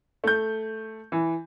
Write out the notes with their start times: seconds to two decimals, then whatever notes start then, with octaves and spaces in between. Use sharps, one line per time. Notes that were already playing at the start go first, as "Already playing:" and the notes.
0.24 A3 G6
1.12 E3